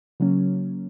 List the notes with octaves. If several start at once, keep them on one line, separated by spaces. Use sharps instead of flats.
C#3 F#3 A#3 C#4